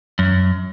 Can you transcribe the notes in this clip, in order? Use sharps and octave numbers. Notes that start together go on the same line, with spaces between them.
F#2